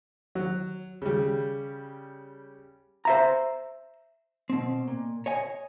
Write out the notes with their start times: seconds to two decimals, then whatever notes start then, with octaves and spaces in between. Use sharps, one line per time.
0.35 F#3
1.02 C#3 G3
3.05 C5 E5 A#5
4.50 B2 C4
4.88 A#2
5.26 C#5 D#5 G#5